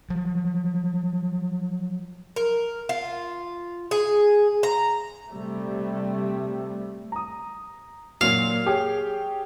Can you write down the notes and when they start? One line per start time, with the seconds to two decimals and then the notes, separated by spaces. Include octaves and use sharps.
0.10 F3 F#3
2.36 A#4
2.89 F4
3.91 G#4
4.63 A#5
5.27 C3 G3 A3
7.12 A#5 D#6
8.21 A#2 F#3 F5
8.66 G4 G#4 C#5